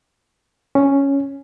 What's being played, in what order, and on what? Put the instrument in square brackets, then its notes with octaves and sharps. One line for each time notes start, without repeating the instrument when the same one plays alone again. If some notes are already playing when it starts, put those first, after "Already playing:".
[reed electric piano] C#4